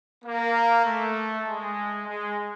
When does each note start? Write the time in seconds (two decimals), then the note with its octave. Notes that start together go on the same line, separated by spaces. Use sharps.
0.24 A#3
0.85 A3
1.46 G#3
2.07 G#3